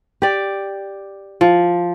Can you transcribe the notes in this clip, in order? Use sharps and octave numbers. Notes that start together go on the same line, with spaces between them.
G4 D5
F3